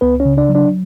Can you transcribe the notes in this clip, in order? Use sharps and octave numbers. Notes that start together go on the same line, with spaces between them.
C#2 B3 B4
C#4 C#5
C#3
D4 D5
F#3
D4 D5